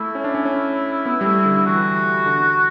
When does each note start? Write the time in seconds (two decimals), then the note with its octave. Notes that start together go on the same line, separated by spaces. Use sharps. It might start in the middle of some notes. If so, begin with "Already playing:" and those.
Already playing: A3 E4
0.15 C#4
0.24 D4
0.35 C#4
0.45 C#4
1.06 B3
1.21 G3
1.26 A3
1.45 D3
1.66 E3 F#4
2.26 D3